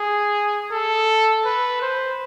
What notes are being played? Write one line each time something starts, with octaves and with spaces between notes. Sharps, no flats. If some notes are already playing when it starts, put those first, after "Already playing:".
Already playing: G#4
A4
B4
C5